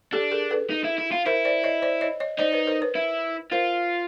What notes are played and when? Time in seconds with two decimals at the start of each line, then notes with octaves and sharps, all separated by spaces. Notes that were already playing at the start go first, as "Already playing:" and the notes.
0.13 D4 G4 A4
0.32 G#4 A#4
0.51 A4 B4
0.70 D#4
0.84 E4
0.98 E4
1.12 F4
1.26 E4 A#4 C5
1.45 C5 D5
1.64 C#5 D#5
1.82 C5 D5
2.01 C#5 D#5
2.20 C#5 D#5
2.39 D#4 C5 D5
2.53 B4 C#5
2.67 A#4 C5
2.82 B4 C#5
2.96 E4
3.52 F4 A#4 C5